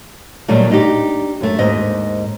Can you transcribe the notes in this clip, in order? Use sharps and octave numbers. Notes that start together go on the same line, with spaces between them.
A#2 D#3 F#3 G3 A3
D4 D#4 G4
F#2 A3
D#2 G#2 C4 D#5